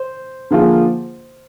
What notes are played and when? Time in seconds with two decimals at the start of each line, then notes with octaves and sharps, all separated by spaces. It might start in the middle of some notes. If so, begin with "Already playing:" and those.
Already playing: C5
0.51 D3 F3 A#3 F4 G#4